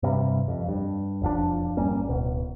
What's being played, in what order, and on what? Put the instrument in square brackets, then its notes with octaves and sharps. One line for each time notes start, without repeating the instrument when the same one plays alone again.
[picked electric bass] G2 C3 G3
F2
G2
E1 F2 F3 D4
G#1 G3 A#3 C#4
D1 B2